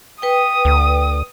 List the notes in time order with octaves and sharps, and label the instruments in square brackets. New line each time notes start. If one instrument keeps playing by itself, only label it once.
[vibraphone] B4 G5 [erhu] D#6
[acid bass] D2